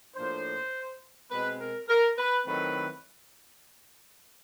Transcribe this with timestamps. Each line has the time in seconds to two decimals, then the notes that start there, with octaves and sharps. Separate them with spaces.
0.16 A2 F3 A#3 D4 C5
1.31 B2 G#3 C4 B4
1.60 A#4
1.89 A#4
2.18 B4
2.46 D#3 F#3 A3 C4 E4 B4